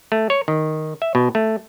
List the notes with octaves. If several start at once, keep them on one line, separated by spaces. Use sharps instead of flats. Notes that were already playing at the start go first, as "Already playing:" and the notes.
A3
C#5
D#3
E5
B2
A3